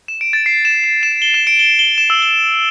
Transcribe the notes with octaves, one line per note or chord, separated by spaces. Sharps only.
E7
D7
A6
C7
E7
E7
E7
G7
E7
D7
G7
G7
E7
E6
G7